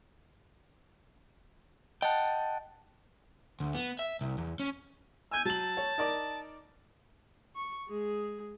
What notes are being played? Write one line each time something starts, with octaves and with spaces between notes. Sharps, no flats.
D#5 F#5 G5 A5
D2
B3
E5
C2
E2
C#4
G#5 E6 G6
F#3 A5 F#7
C#5
D#4 A#4 D5
C#6
G#3 G#4